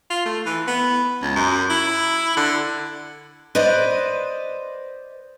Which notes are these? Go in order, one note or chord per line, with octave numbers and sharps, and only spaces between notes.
F4
A3
E3
B3
C#2
F#2
E4
D3
B4 C5 D5 D#5